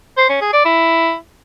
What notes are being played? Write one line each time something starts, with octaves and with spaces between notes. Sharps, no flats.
C5
C#4
G#4
D5
E4